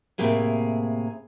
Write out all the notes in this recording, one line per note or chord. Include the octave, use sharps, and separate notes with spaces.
A2 C3 A#3 G#4